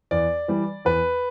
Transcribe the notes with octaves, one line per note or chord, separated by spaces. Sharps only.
E2 D5
E3 G3
E2 B4